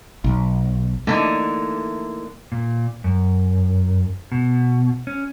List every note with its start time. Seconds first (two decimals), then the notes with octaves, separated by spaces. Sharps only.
0.24 B1
1.07 D3 E3 A3 A#3 D#4
2.52 A#2
3.04 F#2
4.32 B2
5.07 C#4